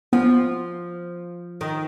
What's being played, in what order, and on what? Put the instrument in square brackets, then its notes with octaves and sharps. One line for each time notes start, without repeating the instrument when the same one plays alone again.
[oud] F3 [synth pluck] B3
[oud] D#3